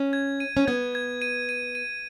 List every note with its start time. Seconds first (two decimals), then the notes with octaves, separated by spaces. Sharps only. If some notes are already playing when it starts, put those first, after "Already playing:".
Already playing: C#4
0.13 G#6
0.40 D#7
0.57 C#4
0.67 B3 G#6
0.95 G#6
1.22 D#7
1.49 D#7
1.75 D#7